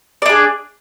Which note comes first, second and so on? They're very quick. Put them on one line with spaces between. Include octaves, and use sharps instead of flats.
D5 D4 G#4